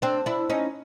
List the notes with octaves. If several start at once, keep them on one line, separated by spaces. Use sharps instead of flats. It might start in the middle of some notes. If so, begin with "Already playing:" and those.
C4 D4
D4 E4
C#4 D#4